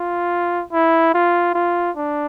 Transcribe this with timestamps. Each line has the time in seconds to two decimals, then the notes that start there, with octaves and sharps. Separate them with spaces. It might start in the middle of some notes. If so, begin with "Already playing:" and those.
Already playing: F4
0.72 E4
1.14 F4
1.54 F4
1.96 D4